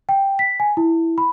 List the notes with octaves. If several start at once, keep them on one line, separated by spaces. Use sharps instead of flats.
G5
B6
G#5
E4
B5